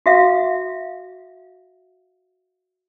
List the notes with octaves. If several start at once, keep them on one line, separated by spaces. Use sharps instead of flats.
F#4 E5 F5